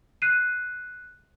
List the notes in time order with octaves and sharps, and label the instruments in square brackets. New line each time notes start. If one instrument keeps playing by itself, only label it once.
[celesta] F#6 C7 D#7